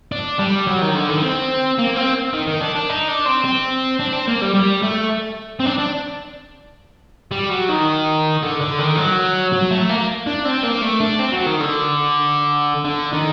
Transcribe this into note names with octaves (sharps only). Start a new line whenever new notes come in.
D4
G3
F#3
D#3
D3
D#3
C4
A#3
C4
D#3
D#3
D4
D4
D#4
D4
C4
C4
D4
C4
A#3
G3
G3
A3
C4
D4
D4
G3
F#3
D#3
D3
D3
D#3
F#3
F#3
A3
A#3
D4
C4
A#3
A3
D4
C4
F#3
D#3
D3
D3
D#3